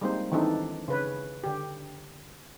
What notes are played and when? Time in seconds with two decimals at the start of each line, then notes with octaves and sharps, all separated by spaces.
0.01 G3 G#3 A#3 C4 D#4 C5
0.32 D#3 E3 C4 D4 D#4 A4
0.88 C#3 B4 C#5
1.44 D3 G4